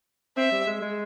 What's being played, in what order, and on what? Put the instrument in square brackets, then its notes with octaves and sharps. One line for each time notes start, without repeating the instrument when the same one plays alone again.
[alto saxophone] C4 [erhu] E5
[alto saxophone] G3
G#3
G#3